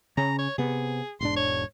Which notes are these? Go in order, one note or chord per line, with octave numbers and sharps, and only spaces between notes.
C#3 C#4 A#5
C#5
C3 B3 G#4
E1 G#2 D4 C6
C#5